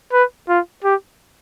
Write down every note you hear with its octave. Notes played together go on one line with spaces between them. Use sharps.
B4
F4
G4